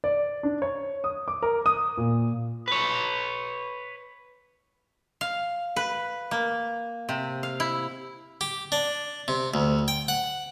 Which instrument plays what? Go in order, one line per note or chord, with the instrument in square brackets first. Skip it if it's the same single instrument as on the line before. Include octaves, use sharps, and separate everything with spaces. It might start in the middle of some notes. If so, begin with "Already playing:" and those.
[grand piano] D5
D4
C#5
D#6
D6
A#4
D#6
A#2
[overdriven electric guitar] B4 C#5
[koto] F5
B4
A#3
C3
F5
E4
[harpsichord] G4
D4
C3
D2
G5
F#5